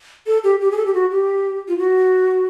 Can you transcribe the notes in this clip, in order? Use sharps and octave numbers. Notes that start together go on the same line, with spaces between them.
A4
G4
G4
G#4
A4
G4
F#4
G4
F4
F#4